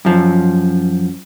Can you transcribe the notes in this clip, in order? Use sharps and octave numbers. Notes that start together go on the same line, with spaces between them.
F#2 F3